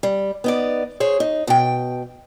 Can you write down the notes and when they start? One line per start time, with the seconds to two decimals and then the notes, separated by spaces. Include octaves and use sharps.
0.03 G3
0.44 B3 D#4 D5
1.00 G#4 C5 C#5
1.20 D#4
1.47 B2 G5